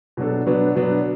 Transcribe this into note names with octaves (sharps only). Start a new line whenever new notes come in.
B2 F#3 D4 A4
B2 F#3 B3 D4
B2 F#3 B3 D4